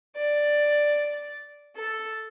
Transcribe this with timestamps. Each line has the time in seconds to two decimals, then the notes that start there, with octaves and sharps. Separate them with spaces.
0.16 D5
1.76 A4